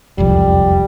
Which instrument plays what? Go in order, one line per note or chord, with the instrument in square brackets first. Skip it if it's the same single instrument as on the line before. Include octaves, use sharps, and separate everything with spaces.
[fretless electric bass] E1 C2 F2 [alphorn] G3